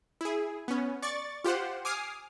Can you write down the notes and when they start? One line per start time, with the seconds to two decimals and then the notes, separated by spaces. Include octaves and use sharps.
0.21 E4 G#4
0.68 B3 C#4
1.02 D5 C#6 A6
1.44 F4 G4 C5 F#5
1.85 G#5 D6 D#6 F6 C7